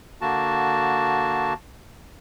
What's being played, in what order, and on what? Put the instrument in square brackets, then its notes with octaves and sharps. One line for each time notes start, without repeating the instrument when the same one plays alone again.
[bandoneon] D3 A#3 F#4 A5